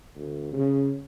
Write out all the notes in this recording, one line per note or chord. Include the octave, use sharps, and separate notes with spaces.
D2
C#3